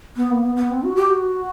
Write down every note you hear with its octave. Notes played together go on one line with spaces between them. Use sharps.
B3
A#3
B3
B3
C4
F#4
G4
F#4